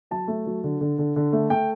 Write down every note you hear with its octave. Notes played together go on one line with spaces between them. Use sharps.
F#3 A5
A3
F#3
D3
D3
D3
D3
A3
A3 G5